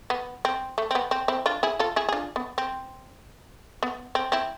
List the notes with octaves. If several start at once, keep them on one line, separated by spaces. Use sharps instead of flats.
B3
C4
A3
C4
B3
C4
C4 E4
D4 F4
E4 G#4
F4 A4
E4 G#4
G#4
D4 F4
B3
C4
B3
C4
C4 E4